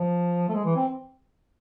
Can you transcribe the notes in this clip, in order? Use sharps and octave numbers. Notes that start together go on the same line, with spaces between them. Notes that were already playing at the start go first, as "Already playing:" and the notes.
Already playing: F3
A3
G#3
E3
C4